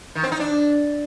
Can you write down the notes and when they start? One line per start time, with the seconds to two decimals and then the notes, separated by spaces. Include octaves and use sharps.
0.15 D#3
0.24 C4
0.32 D#4
0.40 D4